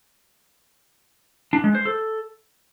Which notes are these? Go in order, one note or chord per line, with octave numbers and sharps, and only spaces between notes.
D4
G#3
C5
A4